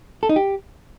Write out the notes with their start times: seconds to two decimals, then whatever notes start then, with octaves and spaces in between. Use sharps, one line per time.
0.23 A4
0.29 D#4
0.36 G4